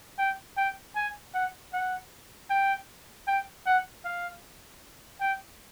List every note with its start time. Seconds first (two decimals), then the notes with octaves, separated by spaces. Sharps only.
0.19 G5
0.57 G5
0.96 G#5
1.34 F#5
1.73 F#5
2.50 G5
3.27 G5
3.66 F#5
4.05 F5
5.20 G5